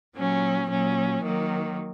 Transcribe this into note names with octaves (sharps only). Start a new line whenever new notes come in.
A#2 F#3 C#4
A#2 F#3 C#4
D#3 F#3 A#3